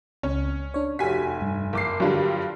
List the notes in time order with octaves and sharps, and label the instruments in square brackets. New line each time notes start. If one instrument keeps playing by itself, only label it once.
[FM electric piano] C#2 [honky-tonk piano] C#4
[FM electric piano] D4 C#5
[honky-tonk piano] F1 G#5 B6 [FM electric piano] F#4 G4 F#5
[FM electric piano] G2
[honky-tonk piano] F#1 D6 C7
[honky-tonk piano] G2 D3 G3 [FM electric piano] F#3 F4